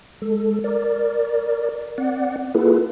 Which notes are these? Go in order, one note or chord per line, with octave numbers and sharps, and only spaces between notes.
G#3 A4
A#4 D5
C4 D5 F#5
A#3 E4 F4 G#4 A4 B4